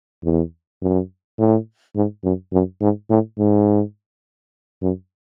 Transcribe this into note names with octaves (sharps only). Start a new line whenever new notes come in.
E2
F#2
A2
G#2
F#2
F#2
G#2
A2
G#2
F#2